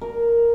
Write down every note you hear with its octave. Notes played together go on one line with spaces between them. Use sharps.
A#4